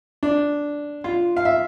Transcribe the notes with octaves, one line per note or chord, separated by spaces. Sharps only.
D4
F4
F5
E5